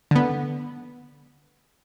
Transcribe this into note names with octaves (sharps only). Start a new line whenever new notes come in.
D3 B3